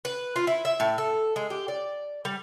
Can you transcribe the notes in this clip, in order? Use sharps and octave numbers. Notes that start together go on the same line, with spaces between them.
B4
F4
E4
E5
A2
A4
G#3
G4
D5
G3